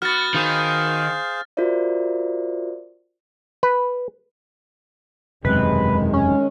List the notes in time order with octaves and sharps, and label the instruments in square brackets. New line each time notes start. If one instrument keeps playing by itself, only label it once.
[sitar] B3 F#4 [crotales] F6 A6
[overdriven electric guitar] D#3 [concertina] G#4 C5 F5
[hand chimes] F4 F#4 A#4 C5 D5 E5
[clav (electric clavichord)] B4
[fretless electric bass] E1 F#2 C3 [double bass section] D#3 G#3 [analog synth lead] B4
[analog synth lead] C#4